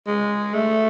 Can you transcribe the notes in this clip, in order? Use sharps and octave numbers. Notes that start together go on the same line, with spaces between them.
G#3
A3